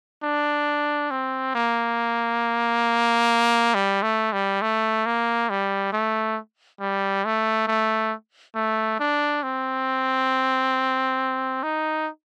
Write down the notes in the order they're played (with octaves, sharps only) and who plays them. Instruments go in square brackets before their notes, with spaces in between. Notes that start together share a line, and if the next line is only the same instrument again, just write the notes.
[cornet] D4
C4
A#3
G3
A3
G3
A3
A#3
G3
A3
G3
A3
A3
A3
D4
C4
D#4